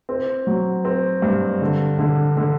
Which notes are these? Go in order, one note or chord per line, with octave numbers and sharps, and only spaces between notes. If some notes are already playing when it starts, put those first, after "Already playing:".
C4
F#3
C4
G2
D3
D3
D3